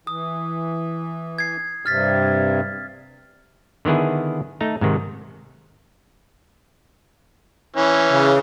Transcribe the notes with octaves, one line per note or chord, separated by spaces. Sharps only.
E3 D#6
G#6 C7
G2 C3 F6 A6 B6
D3 D#3 B3 E4 G#4
A3 D#4 A#5
G#2 C3 D#3
E3 C#4
C#3